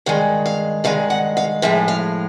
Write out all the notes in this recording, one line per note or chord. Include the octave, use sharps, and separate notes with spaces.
G2 D#3 G#3 F5
F5
G2 D#3 G#3 F5
F#5
F5
A2 F3 G#3 E5
F5